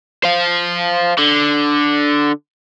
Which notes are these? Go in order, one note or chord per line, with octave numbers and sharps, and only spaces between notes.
C5 F5
D3